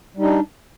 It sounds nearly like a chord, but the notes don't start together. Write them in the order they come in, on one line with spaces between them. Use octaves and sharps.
G3 D#4 D4